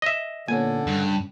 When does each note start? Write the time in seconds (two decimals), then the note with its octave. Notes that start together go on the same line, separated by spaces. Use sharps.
0.02 D#5 E5
0.48 A#2 D3 B3 C#4 G#5
0.87 G2 C#3